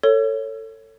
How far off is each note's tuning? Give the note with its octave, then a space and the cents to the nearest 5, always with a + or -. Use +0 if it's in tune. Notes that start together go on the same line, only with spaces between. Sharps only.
A4 +25 C#5 +0